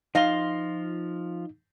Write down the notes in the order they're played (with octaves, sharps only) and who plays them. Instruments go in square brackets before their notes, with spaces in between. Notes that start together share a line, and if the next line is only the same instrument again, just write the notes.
[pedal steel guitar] F3 F4 C6 [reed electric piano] D#4 [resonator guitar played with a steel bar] D#5 F5